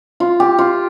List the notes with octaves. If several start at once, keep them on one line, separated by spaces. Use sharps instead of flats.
F4
G4
F4